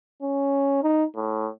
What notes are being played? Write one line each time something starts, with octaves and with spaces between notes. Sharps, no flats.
C#4
D#4
A2